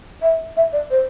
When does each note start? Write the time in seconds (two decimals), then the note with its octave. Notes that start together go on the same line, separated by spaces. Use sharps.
0.22 E5
0.57 E5
0.73 D5
0.91 C5